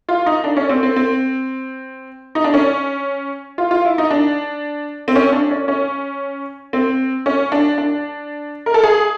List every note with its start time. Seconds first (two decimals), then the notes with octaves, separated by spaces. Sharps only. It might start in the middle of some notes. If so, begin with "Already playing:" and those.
0.09 F4
0.26 D#4
0.44 D4
0.57 C#4
0.69 C4
0.83 C4
0.96 C4
2.35 D#4
2.44 D4
2.54 C#4
3.58 F4
3.71 F4
3.85 E4
3.98 D#4
4.11 D4
5.08 C4
5.15 C#4
5.33 D4
5.51 C#4
5.68 C#4
6.73 C4
7.26 C#4
7.52 D4
7.78 D4
8.66 A#4
8.74 A4
8.84 G#4